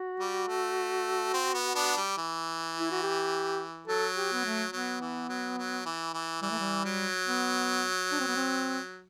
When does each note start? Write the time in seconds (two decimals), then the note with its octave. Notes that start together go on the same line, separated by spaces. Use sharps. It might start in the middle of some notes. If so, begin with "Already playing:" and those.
Already playing: F#4
0.20 G3
0.48 A3
1.33 C4
1.54 B3
1.75 B3 D4
1.97 G3
2.17 E3
2.79 E4
2.91 F#4
3.03 G4
3.87 F#3 A4
4.16 G4
4.33 B3
4.45 A3
4.72 F#3 B3
5.01 E3
5.29 F#3
5.58 F#3
5.85 E3
6.14 E3
6.42 E3 G3
6.51 A3
6.60 G3
6.85 F#3
7.28 B3
8.11 D4
8.20 C4
8.28 B3
8.36 C4